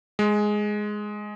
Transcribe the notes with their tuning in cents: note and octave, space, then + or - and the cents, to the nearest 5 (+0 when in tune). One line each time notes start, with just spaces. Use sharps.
G#3 +5